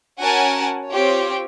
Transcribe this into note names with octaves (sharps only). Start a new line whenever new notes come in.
C#4 F#4 A#4 F#5 G#5 A5
C4 F4 G4 C#5